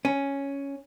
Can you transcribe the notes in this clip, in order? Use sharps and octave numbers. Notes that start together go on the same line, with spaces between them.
C#4